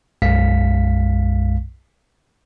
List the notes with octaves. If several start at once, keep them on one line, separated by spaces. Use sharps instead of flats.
B1 F#2 G#3 F5 B6